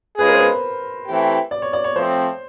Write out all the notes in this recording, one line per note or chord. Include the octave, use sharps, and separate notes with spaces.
G#3 C#4 F4 G#4 B4
A#4
C5
B4
E3 A3 C4 E4 G4
D5
C#5
D5
C#5
F3 A3 C4 C5